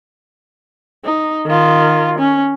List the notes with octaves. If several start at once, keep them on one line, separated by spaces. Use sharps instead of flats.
D#4
D#3 F4
C#4